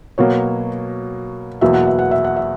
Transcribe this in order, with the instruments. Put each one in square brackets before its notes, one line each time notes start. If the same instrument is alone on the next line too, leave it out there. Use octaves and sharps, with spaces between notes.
[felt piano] B2 F#3 A#3 C#5
E2 B2 F#3 A#3 E5
F#5
E5
F#5
E5
F#5
E5